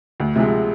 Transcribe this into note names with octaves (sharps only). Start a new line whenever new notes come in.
D2
C3 F3 G#3